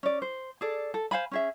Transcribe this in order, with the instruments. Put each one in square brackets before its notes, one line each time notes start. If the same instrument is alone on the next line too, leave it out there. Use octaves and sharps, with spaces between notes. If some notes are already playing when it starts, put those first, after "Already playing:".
[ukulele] C#4 D5
C5
G#4 A4 D5
A4
C5 F5 G#5 B5
C#4 G#4 E5